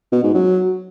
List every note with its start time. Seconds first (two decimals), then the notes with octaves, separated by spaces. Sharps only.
0.12 B2
0.23 G#2
0.34 F#3